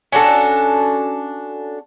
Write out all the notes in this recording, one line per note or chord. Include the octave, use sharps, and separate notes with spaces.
C#4 D4 F#4 A4